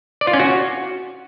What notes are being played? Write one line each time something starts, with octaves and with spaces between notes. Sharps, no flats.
D5
F4
C#4
F#4